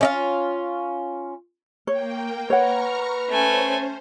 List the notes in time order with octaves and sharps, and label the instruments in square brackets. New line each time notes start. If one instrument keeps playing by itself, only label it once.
[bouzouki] C#4 D#4 F4
[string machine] A#3 G5 [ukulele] C#5
[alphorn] B4 [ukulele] C#5 F#5 [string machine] A#5 C#6 F6
[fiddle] A3 G#5 [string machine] C#4 C5